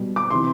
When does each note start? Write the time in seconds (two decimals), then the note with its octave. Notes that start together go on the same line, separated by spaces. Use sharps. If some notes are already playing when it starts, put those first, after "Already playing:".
Already playing: B2 G3
0.16 D6
0.30 C3 E3 C6